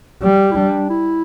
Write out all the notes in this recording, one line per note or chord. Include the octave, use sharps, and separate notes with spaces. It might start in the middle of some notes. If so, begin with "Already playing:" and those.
G3 G4
E4
D4
E4